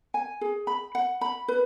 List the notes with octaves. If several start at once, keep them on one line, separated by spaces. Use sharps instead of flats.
G#5
G#4
B5
F#5
B5
B4